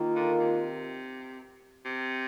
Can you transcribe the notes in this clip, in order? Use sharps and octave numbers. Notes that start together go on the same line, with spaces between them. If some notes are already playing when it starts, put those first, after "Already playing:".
Already playing: D#3 A#3 F4
D3
C3
C3